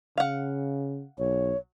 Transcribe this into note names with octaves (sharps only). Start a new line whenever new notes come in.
C#3 F5 F#5
B1 C#5